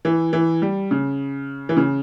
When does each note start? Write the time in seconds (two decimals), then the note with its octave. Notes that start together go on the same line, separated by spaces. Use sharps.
0.05 E3
0.33 E3
0.62 G3
0.91 C#3
1.69 E3
1.77 C#3